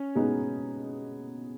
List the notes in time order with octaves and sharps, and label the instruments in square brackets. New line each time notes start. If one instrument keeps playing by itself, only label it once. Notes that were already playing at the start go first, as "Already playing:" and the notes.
Already playing: [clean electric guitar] C#4
[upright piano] B2 G#3 B3 D#4